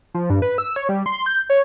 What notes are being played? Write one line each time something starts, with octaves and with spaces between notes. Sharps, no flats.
F3
G2
B4
E6
C#5
G3
C6
G6
C#5